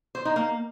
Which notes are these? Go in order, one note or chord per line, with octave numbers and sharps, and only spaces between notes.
C5
D#4
A#3